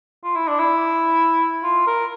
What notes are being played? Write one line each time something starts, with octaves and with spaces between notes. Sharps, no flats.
F4
E4
D4
E4
F4
A#4